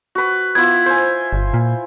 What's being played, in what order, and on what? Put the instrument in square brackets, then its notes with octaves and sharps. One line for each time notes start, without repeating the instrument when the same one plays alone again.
[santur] F#4 B4
[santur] B3 E4 F4 [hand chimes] G#6
[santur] C5 G#5
[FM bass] G1
A#2